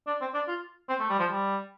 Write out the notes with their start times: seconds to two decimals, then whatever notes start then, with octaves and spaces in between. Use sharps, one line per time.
0.07 D4
0.21 C4
0.34 D4
0.48 F4
0.89 C4
1.00 A3
1.09 G3
1.19 F3
1.31 G3